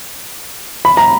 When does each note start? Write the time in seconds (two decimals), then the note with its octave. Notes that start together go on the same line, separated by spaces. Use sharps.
0.85 B5
0.97 A#5